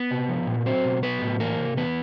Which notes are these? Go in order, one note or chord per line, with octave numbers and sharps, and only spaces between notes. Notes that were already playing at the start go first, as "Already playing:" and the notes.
Already playing: B3 B4
C3
F3
A#2
F#3 C4 C5
B2
F#3 B3 B4
A2
E3 A#3 A#4
C3
E3 B3 B4